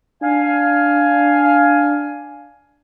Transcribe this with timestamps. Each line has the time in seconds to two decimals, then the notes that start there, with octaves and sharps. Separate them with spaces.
0.23 D4 F5 G#5